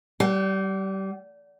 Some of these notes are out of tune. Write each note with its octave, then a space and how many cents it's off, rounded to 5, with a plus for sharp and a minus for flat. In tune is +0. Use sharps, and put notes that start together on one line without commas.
G3 -25 F#5 +45